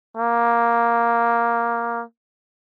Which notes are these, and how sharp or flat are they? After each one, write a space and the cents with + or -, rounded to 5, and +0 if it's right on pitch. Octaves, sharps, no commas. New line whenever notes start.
A#3 +5